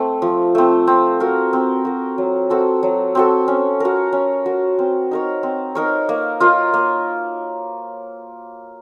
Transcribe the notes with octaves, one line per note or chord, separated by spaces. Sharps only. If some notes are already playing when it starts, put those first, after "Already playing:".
Already playing: A3 C4
F3
A3 C4
C4
F#4 A#4
C4
F#4 A#4
F#3
C4 F#4 A4
F#3
C4 F#4 A4
C#4
F#4 A#4
C#4
F#4 A#4
C4
D#4 A#4 C#5
C4
D#4 A#4 C#5
A#3
F4 A#4 D#5
A#3